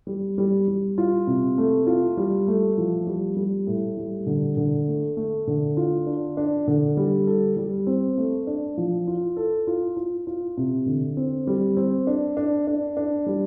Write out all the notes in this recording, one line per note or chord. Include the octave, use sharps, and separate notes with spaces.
G3
G3
G3
F4
C3
A3
F4
G3
A3
F3
G3
G3
A2
G3
D3
D3
A3
A3
D3
F4
D4
D4
D3
G3
A4
G3
C4
A3
D4
F3
F4
A4
F4
F4
F4
C3
D3
C4
G3
C4
D4
D4
D4
D4
G3